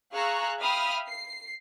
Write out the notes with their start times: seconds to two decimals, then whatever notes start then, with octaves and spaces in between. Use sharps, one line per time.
0.13 G#4 F5 A#5 C#6 E6 F#6
0.59 E5 F5 G5 B5 D#6 F6
1.08 C7